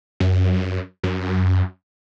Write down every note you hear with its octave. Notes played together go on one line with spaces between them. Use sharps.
F#2
F#2